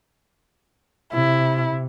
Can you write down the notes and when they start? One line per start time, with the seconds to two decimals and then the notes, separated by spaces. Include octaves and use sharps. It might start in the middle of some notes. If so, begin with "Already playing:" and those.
1.13 C3 E4